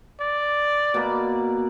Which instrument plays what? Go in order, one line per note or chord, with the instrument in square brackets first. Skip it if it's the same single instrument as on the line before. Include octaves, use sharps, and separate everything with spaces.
[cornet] D5
[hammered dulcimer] B2 A#3 B5